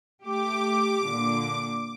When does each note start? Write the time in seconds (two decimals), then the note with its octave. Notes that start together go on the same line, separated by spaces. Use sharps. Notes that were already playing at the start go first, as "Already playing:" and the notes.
0.23 A3 G4 D6
1.05 A#2 D3